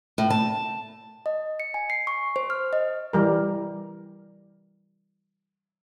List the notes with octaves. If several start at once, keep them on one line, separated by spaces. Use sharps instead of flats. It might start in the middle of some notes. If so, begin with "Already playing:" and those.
A2
A5
D#5
C#7
G#5
C7
C#6
C5
F6
D#5
E3 G3 A#4